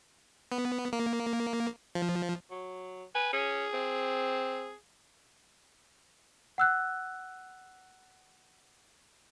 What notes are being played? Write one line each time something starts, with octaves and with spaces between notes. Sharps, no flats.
B3
A#3
F3
F#3
B4 G#5
C#4 G#4
C4
F#5 E6 F#6